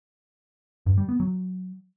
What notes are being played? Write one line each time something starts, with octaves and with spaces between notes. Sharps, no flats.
G2
G3
B3
F#3